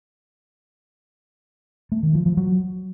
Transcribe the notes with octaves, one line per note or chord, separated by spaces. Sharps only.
A3
D#3
F3
F3
F#3